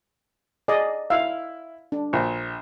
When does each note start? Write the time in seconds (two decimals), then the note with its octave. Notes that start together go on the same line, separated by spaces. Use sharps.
0.68 G#4 D5 D#5
1.10 E4 F5 E6
1.92 D4
2.13 A#1